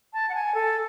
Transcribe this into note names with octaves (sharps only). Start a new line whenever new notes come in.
A5
F#5
G#5
A4